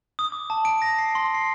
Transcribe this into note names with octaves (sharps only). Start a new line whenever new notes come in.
D#6
D6
A5
D7
A#6
C7
C6
C7